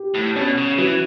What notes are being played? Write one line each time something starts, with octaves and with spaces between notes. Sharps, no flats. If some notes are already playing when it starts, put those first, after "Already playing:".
Already playing: G4
A2
B2 C#4
C#3
E3 F#3